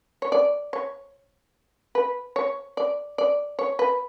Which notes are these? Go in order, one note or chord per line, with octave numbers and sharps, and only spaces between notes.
C#5
D5
C#5
B4
C#5
D5
D5
C#5
B4